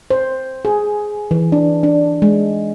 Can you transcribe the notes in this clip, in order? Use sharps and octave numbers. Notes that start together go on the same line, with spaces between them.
C5
G#4
E3
D4
D4
G#3